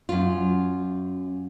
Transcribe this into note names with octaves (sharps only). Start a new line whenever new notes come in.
F#2 F4